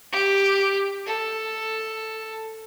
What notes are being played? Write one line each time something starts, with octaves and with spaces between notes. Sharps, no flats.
G4
A4